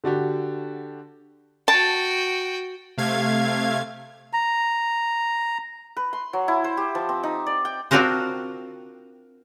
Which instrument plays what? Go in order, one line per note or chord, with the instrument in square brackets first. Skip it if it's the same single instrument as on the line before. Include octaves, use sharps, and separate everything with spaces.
[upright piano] D3 D4 F#4 G4
[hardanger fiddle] F#4 G5 [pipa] A5
[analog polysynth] C3 A3 F5 G#6
[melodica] A#5
[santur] B4
C6
F#3
E4
C5
G4
F3
C4
D#4
D5
G5
[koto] C4 D4 F4 F#4 A#4 C5